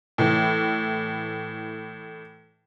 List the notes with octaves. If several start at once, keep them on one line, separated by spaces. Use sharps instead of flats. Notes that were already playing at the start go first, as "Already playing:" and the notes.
A2 E3